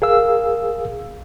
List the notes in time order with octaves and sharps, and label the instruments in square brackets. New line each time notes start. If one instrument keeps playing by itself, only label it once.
[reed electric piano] G#4 A#4 F5 E6